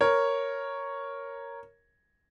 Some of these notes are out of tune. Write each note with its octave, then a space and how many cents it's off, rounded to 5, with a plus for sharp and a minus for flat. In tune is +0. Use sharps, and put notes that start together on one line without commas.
A#4 +0 C#5 +0